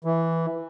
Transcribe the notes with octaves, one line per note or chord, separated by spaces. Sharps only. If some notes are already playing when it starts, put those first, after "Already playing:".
E3